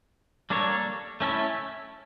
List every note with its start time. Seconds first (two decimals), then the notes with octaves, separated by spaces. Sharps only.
0.50 G3 A#3 D4 A4 C#5
1.21 A3 C#4 E4 A4 C#5